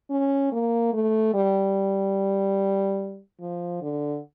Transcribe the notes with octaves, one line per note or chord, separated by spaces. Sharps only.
C#4
A#3
A3
G3
F3
D3